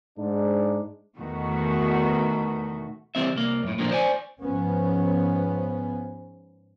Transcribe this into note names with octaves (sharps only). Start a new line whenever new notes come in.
G#2 D4
E2 B2 D#3 A3 F#4
E3 G3 C4 E5
C2 A#3
F#2 A2
A#2 D3 F3 A#3 C4 D4
C5 D5 G#5
G#2 F3 B3 C#4